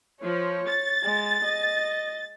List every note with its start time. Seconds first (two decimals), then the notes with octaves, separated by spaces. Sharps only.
0.21 F3 C#5
0.68 A6
1.03 G#3
1.45 D#5